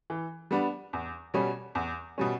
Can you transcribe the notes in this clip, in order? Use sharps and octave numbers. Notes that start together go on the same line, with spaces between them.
E3
G3 B3 D4
E2
B2 G3 C#4
E2
B2 G3 C#4